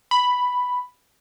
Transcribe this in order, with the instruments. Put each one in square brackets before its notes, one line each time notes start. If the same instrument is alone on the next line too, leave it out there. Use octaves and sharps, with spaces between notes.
[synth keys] B5